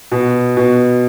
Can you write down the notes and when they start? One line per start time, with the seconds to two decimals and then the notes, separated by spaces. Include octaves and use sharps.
0.12 B2
0.57 B2